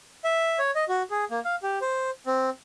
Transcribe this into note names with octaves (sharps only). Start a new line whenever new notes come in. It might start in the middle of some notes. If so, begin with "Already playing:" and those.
E5
C#5
D#5
F#4
G#4
A#3
F5
G4
C5
C4